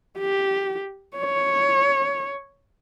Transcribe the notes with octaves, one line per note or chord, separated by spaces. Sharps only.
G4
C#5